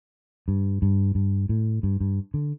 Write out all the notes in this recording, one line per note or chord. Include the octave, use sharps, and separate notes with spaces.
G2
G2
G2
A2
G2
G2
D3